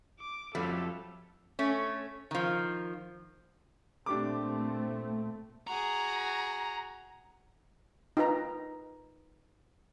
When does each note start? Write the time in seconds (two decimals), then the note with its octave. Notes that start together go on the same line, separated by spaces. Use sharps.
0.20 D6
0.55 F2 F#3 G3 A3 F4 A4
1.59 A3 C#4
2.31 D#3 F3
4.06 A#2 A3 C4 D4 G4 D6
5.67 F#4 G#4 A#5
8.17 D#4 F4 B4 A#5